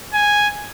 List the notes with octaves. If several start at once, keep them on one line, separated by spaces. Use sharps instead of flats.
G#5